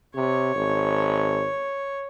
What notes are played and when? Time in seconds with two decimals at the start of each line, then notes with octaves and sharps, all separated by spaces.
0.15 C3 C#5
0.56 G#1